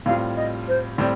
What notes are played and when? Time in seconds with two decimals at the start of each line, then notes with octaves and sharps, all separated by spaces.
0.06 A2 G3 C4 F4 F5
0.36 D#5
0.68 C5
0.98 A2 G3 C4 D5